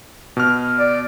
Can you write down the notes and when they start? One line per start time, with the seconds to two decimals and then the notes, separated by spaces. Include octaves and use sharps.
0.37 B2 F6
0.79 D5